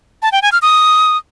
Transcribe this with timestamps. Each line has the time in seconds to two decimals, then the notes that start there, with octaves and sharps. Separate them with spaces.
0.22 A5
0.32 G5
0.42 G#5
0.52 F6
0.62 D#6